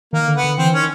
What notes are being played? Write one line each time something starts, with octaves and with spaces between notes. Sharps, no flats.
D#3 A#3
D3
B3
D3
E3 C4
D#3 C#4